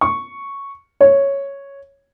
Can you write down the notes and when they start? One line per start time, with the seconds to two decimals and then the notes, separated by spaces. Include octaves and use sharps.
0.01 C#6
1.01 C#5